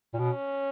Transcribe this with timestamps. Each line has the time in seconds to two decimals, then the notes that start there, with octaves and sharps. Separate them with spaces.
0.14 A#2
0.18 B2 C#4